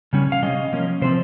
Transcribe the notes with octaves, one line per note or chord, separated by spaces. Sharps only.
C#3 G3 C#4
F5
C3 G3 C#4 D#5
F3 A#3 C#4
C3 F3 C4 C5